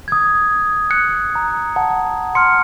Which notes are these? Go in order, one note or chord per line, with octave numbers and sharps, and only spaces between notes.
D#6 G#6
F#6 C#7
A#5
F#5 A5
C6 F6 C#7